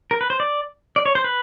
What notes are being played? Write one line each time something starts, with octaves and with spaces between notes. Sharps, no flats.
A#4
B4
C5
D5
D5
C#5
C5
B4